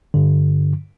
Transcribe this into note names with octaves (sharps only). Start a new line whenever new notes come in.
G2 D3